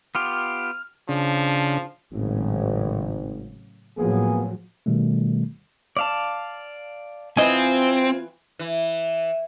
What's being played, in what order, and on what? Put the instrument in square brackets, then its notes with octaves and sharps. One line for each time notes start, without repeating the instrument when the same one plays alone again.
[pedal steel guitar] B3 F4 G4 [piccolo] F6
[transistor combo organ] C#3 D4 [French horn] F3
[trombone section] G#1 [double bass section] A2 C#3 F#3
[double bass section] A2 F3 F#3 [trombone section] A#3 B3 G#4
[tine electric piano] B2 D#3 G3 A3
[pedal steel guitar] D5 F5 A5
[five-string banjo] E3 D#5 [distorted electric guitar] C4 [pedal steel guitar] F4 G#5
[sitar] E3